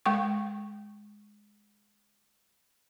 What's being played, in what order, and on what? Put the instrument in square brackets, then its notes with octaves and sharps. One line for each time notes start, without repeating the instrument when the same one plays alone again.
[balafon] G#3 G5 C#6